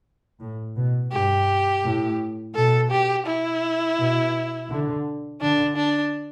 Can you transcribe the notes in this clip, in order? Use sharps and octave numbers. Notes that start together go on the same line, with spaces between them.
A2
B2
G2 G4
A2
B2 A4
G4
E4
B2
D3
D3 D4
D4